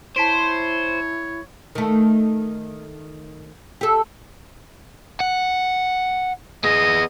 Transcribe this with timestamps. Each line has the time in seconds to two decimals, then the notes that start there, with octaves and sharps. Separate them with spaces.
0.16 E4 C5 C#5 A5 B6 D7
1.75 D#3 A3
3.81 G4 A4
5.20 F#5
6.64 B3 G#4 D#5